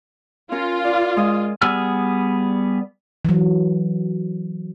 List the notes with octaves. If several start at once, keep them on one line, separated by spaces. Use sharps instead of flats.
C#4 F4 A#4
D5
G#3 D#6
G3 B3 G#4 E6 F6
E3 F#3